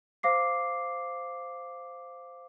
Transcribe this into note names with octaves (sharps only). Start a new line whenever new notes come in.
C5 F5 D6 C7